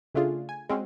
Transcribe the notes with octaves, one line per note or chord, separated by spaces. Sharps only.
C#3 A3 D4 F4 G#4
G#5
G#3 C4 C#4 F#4